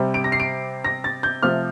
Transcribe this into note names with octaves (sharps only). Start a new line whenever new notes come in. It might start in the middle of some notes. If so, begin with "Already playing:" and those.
Already playing: C3 G3 C4
D7
A#6
C7
D7
A#6
A6
G6
C3 F3 A3 F6